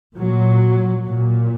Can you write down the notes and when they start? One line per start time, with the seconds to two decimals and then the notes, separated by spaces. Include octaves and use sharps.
0.17 A#2 F#3
1.07 A#2